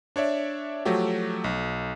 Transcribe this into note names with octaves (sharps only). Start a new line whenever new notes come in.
D4 C#5 D5 E5
F3 F#3 A3 F#4 G4
B1